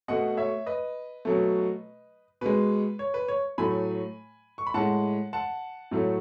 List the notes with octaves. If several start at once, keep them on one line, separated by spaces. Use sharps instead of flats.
B2 A3 D#5 F#5
C#5 E5
B4 D#5
B2 F#3 A3
B2 G#3 B4
C#5
B4
C#5
A2 F#3 A3 G#5 B5
C#6
B5
A2 G#3 F#5 A5
F#5 A5
A2 F#3 A3